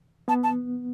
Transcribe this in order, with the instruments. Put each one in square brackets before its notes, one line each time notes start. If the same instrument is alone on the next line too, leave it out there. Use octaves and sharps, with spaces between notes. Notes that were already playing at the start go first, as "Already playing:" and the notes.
[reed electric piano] B3 [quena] A5
[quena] A5